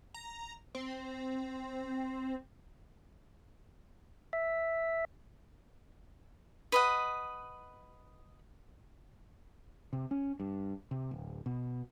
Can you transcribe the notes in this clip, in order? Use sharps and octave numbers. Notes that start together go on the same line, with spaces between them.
A#5
C4
E5
B4 D#5 F#5
C3
C#4
G2
C3
D1
B2